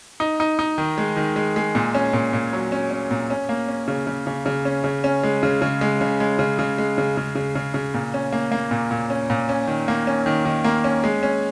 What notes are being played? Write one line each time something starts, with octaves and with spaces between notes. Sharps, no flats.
D#4
D#4
D#4
D#3
G#3
D#3
G#3
G#3
A#2
C#4
A#2
A#2
F#3
C#4
C#4
A#2
C#4
A#3
C#4
C#3
C#3
C#3
C#3
C#4
C#3
C#4
G#3
C#3
C#3
G#3
C#3
G#3
C#3
C#3
G#3
C#3
C#3
C#3
C#3
C#3
A#2
C#4
A#3
A#3
A#2
A#2
C#4
A#2
C#4
D#3
A#3
C#4
D#3
D#3
A#3
C#4
G#3
C#4